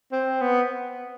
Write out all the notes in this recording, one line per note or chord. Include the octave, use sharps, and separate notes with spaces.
C4
B3